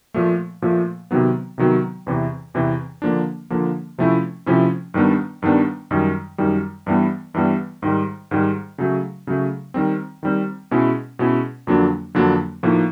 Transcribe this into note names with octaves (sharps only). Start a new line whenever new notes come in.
A#2 F3 A3
A#2 F3 A3
C3 D#3 F#3 B3
C3 D#3 F#3 B3
E2 C3 E3
E2 C3 E3
D3 F3 A#3 D4
D3 F3 A#3 D4
C3 F3 A3 C#4 E4
C3 F3 A3 C#4 E4
G2 D#3 G3 B3 D4
G2 D#3 G3 B3 D4
F#2 D#3 G3
F#2 D#3 G3
G2 E3 G3 B3
G2 E3 G3 B3
G#2 D#3 G3
G#2 D#3 G3
C#3 F#3 A3
C#3 F#3 A3
D#3 G3 C4
D#3 G3 C4
B2 G#3 C#4 E4
B2 G#3 C#4 E4
F2 D3 F#3 A#3 D4
F2 D3 F#3 A#3 D4
A2 F3 A#3 D#4